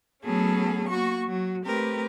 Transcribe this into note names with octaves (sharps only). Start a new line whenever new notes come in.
F#3 A3 B3 C#4 G#4 A4
A#3 F#4 C#6
F#3 F#4
A3 C4 G4 A#4 B4